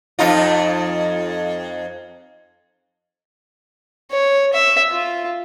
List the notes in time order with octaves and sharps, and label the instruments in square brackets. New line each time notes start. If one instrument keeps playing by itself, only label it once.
[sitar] F2 D#4 F4
[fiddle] C#5
E5
F4